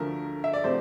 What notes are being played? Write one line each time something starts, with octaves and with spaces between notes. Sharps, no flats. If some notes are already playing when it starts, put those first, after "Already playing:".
Already playing: D2 D3 F3 A3 A#4
E5
D5
C3 F3 A3 C5